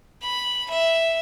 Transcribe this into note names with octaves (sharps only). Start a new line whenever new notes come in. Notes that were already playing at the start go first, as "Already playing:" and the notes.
B5
E5